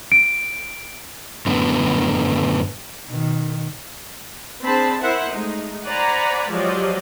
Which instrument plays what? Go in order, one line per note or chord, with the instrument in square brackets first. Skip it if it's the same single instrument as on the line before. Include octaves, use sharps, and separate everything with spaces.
[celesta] D7
[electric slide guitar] F#2 A2 D3 B3
[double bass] B2 D#3
[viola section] C4 D4 G#4 C5 A5 B5
E4 A#4 C5 E5 F#5
G#3 A3 D#4
C5 D5 F#5 G#5 A#5 B5
F3 F#3 G#3 G4 D5 D#5